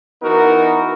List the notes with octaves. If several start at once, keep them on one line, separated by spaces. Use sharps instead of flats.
E3 B3 D#4 F#4 A#4